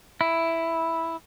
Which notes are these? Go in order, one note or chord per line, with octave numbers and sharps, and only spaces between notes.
E4